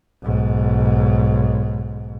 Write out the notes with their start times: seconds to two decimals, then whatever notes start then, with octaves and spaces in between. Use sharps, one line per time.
0.23 B1 G#2